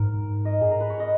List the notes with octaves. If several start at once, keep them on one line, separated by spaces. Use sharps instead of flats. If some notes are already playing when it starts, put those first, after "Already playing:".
Already playing: G#2 A#4
D#5
G#4
A#4
B4
C#5
D#5